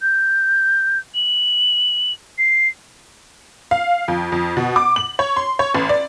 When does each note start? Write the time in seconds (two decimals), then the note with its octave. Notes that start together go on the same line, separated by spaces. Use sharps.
0.01 G6
1.15 F#7
2.38 C7
3.71 F5
4.08 F2
4.32 F2
4.57 B2
4.76 D6
4.96 F#7
5.19 C#5
5.36 C6
5.59 C#5
5.75 A1
5.89 D5